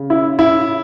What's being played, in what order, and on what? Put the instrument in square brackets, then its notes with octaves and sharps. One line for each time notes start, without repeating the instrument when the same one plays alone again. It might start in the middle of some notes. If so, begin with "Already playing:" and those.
Already playing: [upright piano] C#3
[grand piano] E4
E4